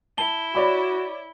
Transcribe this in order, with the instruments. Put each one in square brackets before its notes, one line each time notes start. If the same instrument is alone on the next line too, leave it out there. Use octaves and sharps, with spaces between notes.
[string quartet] E4 [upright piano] A5 [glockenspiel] G7
[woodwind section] F#4 [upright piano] C#5 D5 B5